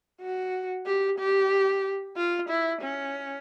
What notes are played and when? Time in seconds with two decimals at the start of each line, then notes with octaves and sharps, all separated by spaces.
0.22 F#4
0.86 G4
1.19 G4
2.17 F4
2.49 E4
2.82 C#4